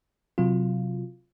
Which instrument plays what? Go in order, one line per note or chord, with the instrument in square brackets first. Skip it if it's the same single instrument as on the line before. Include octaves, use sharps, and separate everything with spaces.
[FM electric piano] C3 F#3 F4